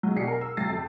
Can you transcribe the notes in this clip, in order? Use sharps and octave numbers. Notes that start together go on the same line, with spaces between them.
F#3 G#3
B2 D4 G4 C7 C#7
A#4
E6
C3 F#3 A6 C7
F2